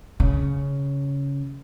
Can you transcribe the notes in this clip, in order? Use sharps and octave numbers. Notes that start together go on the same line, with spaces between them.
C#3